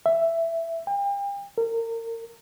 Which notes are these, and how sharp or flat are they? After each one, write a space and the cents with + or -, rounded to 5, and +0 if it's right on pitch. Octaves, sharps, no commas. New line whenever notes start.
E5 +10
G5 +40
A#4 -35